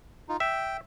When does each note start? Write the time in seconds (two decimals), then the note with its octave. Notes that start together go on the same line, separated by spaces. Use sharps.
0.29 D#4 F4
0.40 E5 G5